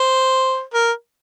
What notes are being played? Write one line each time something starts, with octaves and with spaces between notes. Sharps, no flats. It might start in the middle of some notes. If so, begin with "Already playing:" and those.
Already playing: C5
A#4